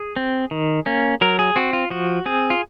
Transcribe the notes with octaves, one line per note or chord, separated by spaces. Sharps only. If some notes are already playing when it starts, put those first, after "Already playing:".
Already playing: G#4
C4
D#3
A#3 C#4
F#3 A#4
G#4
C4 F#4
F4
F3 F#4
C4 G#4
F4